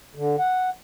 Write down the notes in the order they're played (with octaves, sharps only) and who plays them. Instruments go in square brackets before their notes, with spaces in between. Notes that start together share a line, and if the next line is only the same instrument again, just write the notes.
[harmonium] D3
F#5